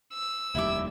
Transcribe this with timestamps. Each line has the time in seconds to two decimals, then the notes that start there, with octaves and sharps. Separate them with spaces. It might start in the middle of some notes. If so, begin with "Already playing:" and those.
0.14 E6
0.55 F1 D#2 G3 E4 E5 D6